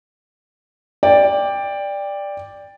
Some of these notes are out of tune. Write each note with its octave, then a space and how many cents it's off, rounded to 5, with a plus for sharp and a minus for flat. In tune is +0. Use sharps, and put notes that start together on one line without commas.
D5 +0 G5 +20